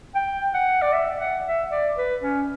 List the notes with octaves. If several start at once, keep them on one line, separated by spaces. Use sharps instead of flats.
G5
F#5
D5
E5
F#5
E5
D5
B4
C#4